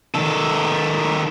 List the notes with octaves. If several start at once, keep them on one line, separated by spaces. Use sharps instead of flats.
D#3 A4